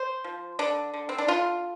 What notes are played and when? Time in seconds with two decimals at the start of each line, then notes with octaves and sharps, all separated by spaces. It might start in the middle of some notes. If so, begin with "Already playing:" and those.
Already playing: C5
0.24 F3
0.59 D3 D4
0.94 D3
1.09 C4
1.18 D4
1.28 D3 F4